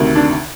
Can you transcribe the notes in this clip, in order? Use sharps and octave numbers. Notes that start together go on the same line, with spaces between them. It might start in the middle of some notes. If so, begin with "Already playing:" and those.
Already playing: D2 C3 D#3
D4